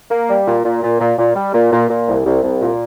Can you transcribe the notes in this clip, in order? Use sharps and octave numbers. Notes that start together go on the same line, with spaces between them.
A#3
G3
A#2
A#2
A#2
A#2
A#2
G3
A#2
A#2
A#2
C2
C2
C2
A#2